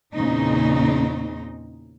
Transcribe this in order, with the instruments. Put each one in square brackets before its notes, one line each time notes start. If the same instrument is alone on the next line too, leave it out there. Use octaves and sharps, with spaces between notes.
[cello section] E2 A#2 C#3 C4 D#4